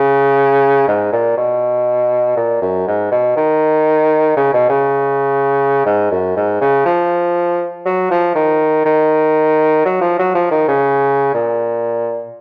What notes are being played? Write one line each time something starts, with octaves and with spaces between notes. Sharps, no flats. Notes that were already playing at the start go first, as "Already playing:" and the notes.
Already playing: C#3
G#2
A#2
B2
A#2
F#2
G#2
B2
D#3
C#3
B2
C#3
G#2
F#2
G#2
C#3
F3
F#3
F3
D#3
D#3
F#3
F3
F#3
F3
D#3
C#3
A#2